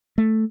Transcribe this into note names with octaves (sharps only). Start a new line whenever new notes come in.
A3